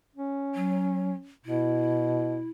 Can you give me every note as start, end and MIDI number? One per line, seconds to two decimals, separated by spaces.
0.16 1.32 61
0.55 1.11 54
1.46 2.49 47
1.46 2.50 64